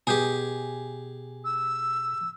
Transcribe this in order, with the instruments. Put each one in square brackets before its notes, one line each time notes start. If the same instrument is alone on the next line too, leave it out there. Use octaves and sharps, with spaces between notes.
[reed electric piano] B2 G#5 G6 [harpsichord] G4 G#4
[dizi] E6